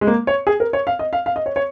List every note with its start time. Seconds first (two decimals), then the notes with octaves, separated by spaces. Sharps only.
0.01 G#3
0.07 A#3
0.27 C#5
0.47 G#4
0.60 A#4
0.73 C#5
0.87 F5
0.99 D#5
1.13 F5
1.26 F5
1.36 D#5
1.46 C#5
1.56 C#5